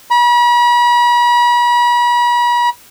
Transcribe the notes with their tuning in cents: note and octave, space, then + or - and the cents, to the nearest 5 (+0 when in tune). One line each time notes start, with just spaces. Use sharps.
B5 -40